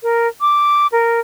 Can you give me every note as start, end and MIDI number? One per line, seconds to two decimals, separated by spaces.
0.03 0.28 70
0.41 0.87 86
0.92 1.20 70